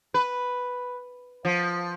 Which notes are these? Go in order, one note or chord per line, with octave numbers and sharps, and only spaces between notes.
B4
F3